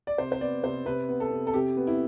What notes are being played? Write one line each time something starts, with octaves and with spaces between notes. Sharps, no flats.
D5
C3 C5
C5
B3 D5
C3 C5
C3 B4
B3
A4
C3
A4
C3 G4
B3
E4